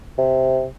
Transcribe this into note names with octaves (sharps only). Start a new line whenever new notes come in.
C3